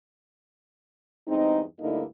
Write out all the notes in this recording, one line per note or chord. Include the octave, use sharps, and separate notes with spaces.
E2 G2 G#3 C4 D#4
D2 G2 D3 A#3 D#4 E4